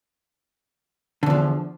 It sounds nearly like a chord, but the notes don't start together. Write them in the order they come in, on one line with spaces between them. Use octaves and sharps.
D3 E2 F3